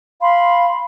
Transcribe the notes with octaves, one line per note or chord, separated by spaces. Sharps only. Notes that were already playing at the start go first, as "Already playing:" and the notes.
F5 B5 C6